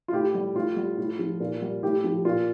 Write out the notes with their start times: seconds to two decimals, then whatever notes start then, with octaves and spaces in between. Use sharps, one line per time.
0.08 F4
0.13 A2 G4
0.34 G3
0.55 A2 F4
0.76 G3
0.97 A2
1.19 F3
1.40 A#2
1.62 G3
1.82 A2 G4
2.04 F3
2.25 A#2 F4